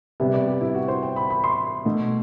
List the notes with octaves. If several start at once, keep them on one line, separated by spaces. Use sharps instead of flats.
C3 G3 B3 E5
D5
G4
E4
F#4
C5
G5
B5
B5
C6
B2 A3